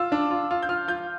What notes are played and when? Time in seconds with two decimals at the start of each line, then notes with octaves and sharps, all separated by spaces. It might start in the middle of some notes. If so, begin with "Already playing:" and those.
Already playing: F4 E6
0.12 D4
0.31 F4
0.51 F4
0.63 G6
0.69 F4 F6
0.88 F4 G6